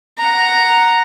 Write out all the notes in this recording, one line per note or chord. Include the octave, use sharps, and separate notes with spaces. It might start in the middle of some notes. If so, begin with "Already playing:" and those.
F#5 A#5